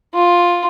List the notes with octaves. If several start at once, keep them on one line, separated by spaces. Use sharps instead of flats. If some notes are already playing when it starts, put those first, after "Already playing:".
F4